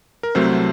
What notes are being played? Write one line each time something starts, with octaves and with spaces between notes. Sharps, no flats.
A#4
C2 C3 F#3 A3 C4 C5